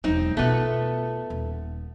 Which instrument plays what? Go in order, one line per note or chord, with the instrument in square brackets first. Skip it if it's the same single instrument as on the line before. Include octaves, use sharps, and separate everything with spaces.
[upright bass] E1 F#3 [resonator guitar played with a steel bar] C4 D#4
[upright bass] B2 F4 [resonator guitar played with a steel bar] A3 B3
[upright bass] D#1